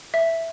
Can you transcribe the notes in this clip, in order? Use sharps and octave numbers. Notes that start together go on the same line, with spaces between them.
E5